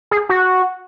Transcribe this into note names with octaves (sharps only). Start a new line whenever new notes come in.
G#4
F#4